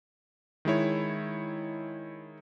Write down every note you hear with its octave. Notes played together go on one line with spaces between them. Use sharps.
D#3 G#3 E4 C#5